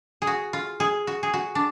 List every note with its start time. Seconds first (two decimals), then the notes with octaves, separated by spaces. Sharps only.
0.22 G#4
0.27 F#4
0.53 F4
0.80 G#4
1.07 F#4
1.23 G#4
1.33 F#4
1.55 D4